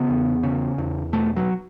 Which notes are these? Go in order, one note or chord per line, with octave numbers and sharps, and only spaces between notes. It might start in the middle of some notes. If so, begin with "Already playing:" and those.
Already playing: C#3 B3
E2
C#3
E2
B2 A3
F#3